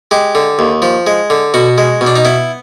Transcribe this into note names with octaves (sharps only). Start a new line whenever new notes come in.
G#3 G4
D3
D#2
F3
G#3
D3
B2 F#4
G#3
B2
D4
D#4
B3 E4